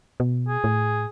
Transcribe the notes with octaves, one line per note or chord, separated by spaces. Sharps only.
B2
G#4
A2